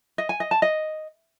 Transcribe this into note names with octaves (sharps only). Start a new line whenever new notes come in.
D#5
G#5
D#5
A5
D#5